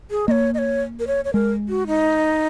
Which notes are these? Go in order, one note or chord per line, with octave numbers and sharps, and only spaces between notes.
G#4
A#3 C#5 D#5
D#5
C#5
A#4
C#5
C#5
G#3 A#4
F#4
D#4